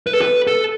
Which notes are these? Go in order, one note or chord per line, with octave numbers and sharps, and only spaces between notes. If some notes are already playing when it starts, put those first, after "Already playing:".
B4
A4
B4
A4